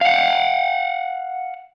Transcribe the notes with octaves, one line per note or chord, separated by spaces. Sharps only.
F5 F#5